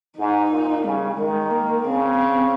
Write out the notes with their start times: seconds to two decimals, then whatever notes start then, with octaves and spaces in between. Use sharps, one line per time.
0.18 G#2 D#4
0.51 A#2
0.85 C#3 G3
1.18 D#3 G#3
1.51 A#3
1.84 C#3 C4
2.17 C4